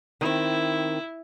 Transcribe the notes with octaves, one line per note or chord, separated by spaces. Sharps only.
D#3 C4 E4